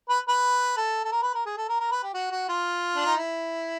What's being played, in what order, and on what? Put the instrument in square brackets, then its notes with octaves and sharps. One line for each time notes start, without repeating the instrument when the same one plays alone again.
[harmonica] B4
B4
A4
A4
A#4
B4
A#4
G#4
A4
A#4
A#4
B4
G4
F#4
F#4
F4
D4
D#4
E4